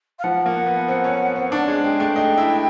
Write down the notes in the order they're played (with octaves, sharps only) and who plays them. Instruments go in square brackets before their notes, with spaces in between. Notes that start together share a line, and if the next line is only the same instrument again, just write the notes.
[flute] F5
[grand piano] F3 [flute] F#5
[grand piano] A#3
B3
C4
C#4
C4
D4
G#3
[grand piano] G#3 [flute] G5
[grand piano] A3
D#4
E4